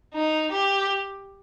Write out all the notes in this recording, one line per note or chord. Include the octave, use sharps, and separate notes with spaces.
D#4
G4